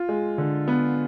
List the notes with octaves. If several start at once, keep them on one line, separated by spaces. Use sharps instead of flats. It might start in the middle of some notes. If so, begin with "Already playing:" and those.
Already playing: F4
G#3
D3
B3